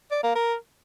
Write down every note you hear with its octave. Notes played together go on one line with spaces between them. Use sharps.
D5
A#3
A#4